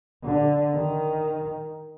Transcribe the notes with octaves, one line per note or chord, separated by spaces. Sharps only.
D3
D#3